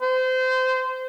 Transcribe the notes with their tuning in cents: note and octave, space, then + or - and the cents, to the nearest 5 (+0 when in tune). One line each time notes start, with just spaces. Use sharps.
C5 -25